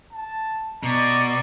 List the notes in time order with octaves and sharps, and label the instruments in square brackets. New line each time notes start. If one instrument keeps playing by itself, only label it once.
[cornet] A5
[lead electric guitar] B2 [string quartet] D5 D#5 C#6 [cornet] A#5